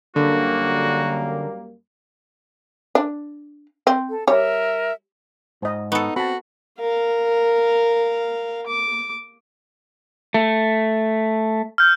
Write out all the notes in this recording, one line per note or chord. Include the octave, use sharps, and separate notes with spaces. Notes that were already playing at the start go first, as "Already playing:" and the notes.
F#2 D3 G3 A#3 F#4
D4
C4
A4
G3 A#4 C#5 E5
G#2 C5 D#5
B3 D#4 A4 C#6
C4 F#4 A5 B5
A#4 F5
D6
A3
F6 G6